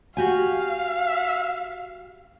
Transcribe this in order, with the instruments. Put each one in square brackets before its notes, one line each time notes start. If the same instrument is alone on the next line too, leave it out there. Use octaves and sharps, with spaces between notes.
[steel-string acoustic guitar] F#4 G4 G#5 [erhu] F5